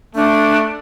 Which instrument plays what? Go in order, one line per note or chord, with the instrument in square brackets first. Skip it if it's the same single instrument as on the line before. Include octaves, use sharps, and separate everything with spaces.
[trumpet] A3 [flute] D4